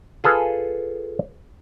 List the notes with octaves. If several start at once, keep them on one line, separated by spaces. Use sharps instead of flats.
F4 G#4 A4 B4